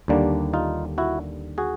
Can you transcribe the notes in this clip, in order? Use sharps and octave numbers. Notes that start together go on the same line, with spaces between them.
D#2 D3 G3 A#3 D4
D#4 F4
E4 F#4
F#4 G#4